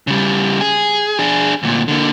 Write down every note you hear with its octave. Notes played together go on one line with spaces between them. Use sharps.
C#3 G3
G#4
D4 G#4
D2 A#2
D3 A#3